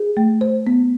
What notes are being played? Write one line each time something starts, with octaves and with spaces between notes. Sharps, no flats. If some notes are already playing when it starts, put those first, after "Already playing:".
Already playing: G#4
A3
C5
B3